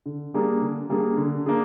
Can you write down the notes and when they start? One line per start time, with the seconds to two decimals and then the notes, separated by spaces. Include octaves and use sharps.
0.06 D3
0.34 G3 A#3 D4 G#4
0.62 D3
0.90 G3 A#3 D4 G#4
1.17 D3
1.46 A#3 D4 G#4